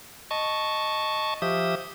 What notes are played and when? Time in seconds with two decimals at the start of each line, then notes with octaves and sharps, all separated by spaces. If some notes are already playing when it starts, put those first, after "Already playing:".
0.31 D#5 A5 C#6
1.42 F3 G4 E5 D#6